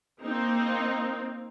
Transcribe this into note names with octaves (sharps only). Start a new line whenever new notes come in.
A#3 C4 D#4